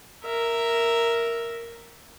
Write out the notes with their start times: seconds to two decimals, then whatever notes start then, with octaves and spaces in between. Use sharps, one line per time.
0.24 A#4 E5